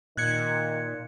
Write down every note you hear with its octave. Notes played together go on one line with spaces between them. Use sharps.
A#2 D#3 F#6 G#6 C#7